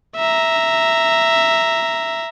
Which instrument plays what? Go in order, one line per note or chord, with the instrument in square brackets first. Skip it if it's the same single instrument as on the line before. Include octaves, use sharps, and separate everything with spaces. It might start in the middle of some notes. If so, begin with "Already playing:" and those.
[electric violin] E5 A#5